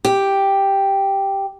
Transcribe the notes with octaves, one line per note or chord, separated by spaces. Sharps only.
G4